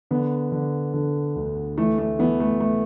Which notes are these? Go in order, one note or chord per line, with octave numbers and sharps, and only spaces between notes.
D3 B3
D3
D3
D2
E3 A3
A3
E3 B3
A3
A3